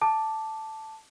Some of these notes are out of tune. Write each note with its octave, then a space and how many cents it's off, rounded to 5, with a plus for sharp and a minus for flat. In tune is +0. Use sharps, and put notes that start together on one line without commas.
A5 +0 D6 +0